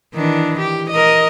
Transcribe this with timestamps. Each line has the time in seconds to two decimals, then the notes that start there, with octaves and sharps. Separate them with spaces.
0.15 D#3 E3 D4
0.59 G4
0.90 A#4 D#5